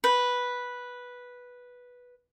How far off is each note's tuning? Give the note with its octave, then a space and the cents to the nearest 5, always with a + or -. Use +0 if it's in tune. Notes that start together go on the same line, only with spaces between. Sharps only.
B4 -5